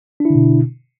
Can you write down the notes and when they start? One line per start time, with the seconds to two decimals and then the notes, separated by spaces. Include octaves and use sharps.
0.20 D4
0.25 E4
0.30 D3
0.35 B2